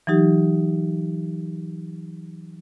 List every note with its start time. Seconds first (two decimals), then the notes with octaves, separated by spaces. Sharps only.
0.07 E3 F#3 D#4 G4